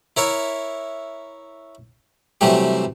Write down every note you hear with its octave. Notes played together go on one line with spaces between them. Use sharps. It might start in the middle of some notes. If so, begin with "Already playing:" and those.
E4 A#4 C#5 E5
C3 E3 F#3 G3 A3 G4